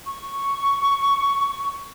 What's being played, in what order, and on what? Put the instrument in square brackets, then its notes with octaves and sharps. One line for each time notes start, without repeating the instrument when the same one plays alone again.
[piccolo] C#6